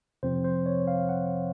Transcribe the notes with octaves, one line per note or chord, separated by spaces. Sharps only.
F2 C3 F3 C4 C5
C5
C#5
F5
F#5